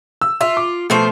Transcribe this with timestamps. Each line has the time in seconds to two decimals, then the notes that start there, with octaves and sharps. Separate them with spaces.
0.21 E6
0.41 F4 E5
0.57 D6
0.90 B2 F3 A3 C5